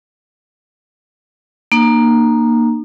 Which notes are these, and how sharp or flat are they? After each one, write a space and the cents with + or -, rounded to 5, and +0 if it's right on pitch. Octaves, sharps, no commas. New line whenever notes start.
A#3 +5 D#4 -45